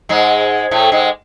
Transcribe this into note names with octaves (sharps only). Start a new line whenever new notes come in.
G#2 G#3
A2 A3
G#2 G#3